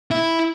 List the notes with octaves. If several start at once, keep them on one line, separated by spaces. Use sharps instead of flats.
E4